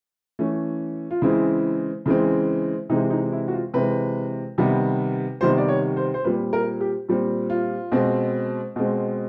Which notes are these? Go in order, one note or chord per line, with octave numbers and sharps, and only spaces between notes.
E3 A3 C#4
F4
C#3 E3 G#3 C4 E4
C#3 E3 G#3 C4
C3 E3 G#3 C4 D#4
D#4
E4
F#4
F4
C3 E3 G#3 C4 B4
C3 D#3 G3 B3
C3 D#3 G3 B3 C5
D5
C#5
C5
C5
A#2 G3 C4 B4
A#4
G4
A#2 G3 C4
F4
B2 G#3 C4
B2 G#3 C4